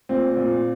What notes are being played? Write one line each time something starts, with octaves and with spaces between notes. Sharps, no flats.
A#2 C4
A#2